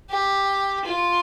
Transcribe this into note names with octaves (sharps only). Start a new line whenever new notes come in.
G4
F4